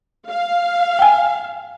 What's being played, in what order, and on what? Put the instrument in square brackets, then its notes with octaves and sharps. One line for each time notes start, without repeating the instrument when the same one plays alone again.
[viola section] F5
[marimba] G5 G#5